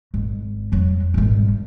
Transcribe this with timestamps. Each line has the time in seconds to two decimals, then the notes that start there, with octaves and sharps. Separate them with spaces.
0.14 G#1
0.72 F2 F#3
1.14 G#1 G2